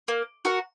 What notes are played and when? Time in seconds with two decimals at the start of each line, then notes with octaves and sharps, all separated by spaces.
0.08 A#3
0.45 F#4 A#4 F#5